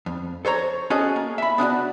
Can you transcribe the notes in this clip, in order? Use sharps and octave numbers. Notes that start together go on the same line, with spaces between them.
F2
A4 C5 C#5 A#5
C#4 F#4 G#4 A4 D#5
A#3
E5 B5
B3 D4 D#4 F#4